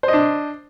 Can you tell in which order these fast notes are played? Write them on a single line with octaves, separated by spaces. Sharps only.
C5 D#5 D4